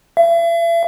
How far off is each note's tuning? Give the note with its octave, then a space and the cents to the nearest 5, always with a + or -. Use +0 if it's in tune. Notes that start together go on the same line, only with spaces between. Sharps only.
E5 +40